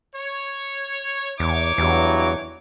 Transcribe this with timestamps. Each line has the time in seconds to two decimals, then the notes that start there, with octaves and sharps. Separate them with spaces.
0.15 C#5
1.40 E2 D#4 C#5 D6
1.78 E2 G2 E3 F#3